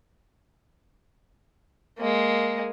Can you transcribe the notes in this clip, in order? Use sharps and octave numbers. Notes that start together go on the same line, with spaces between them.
G#3 A#3